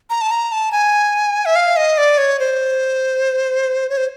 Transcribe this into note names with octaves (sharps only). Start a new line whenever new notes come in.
A#5
A5
A#5
A5
G#5
E5
F5
D#5
D5
C#5
C5
C#5
C5